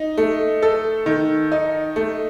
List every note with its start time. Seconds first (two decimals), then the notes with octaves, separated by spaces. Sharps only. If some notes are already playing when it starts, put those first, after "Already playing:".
Already playing: D#4
0.18 A3
0.63 A4
1.06 D#3
1.52 D#4
1.96 A3